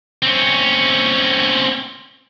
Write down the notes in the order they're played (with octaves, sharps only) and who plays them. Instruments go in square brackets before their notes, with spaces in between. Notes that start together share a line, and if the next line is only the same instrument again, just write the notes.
[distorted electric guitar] C4 C#4